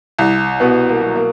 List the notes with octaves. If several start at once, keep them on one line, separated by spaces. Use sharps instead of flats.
C2
B2 B3
A#3
F#3
A#3